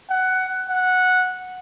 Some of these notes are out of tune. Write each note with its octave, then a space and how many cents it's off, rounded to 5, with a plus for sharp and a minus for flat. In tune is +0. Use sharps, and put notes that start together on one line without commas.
F#5 +15
F#5 -10